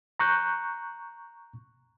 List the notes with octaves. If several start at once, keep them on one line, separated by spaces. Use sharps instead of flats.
A#5 C#6 F#6 G6